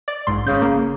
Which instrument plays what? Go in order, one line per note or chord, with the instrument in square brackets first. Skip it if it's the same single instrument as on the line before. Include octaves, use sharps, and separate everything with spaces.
[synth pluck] D5
A#1 G#2 C6
[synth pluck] G#1 G6 [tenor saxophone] C#3
[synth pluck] A#3